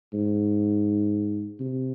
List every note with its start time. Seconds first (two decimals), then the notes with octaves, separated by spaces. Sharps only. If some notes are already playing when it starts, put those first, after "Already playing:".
0.13 G#2
1.59 C3